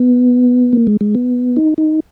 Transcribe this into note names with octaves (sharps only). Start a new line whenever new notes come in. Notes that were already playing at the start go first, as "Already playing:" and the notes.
Already playing: B3
A#3
G#3
G#3
B3
D#4
D#4